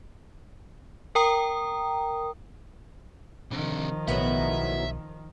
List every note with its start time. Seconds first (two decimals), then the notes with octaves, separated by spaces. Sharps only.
1.15 A#4 G5 A#5 D#6
3.51 C3 D#3 F3 D4
4.08 B1 A2 F#3 B3 E5